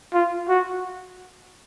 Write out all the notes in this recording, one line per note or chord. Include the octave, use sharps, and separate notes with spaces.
F4
F#4